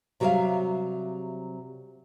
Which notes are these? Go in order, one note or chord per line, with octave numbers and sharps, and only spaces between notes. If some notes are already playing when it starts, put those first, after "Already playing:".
C3 F#3 G3 C5 E5 F5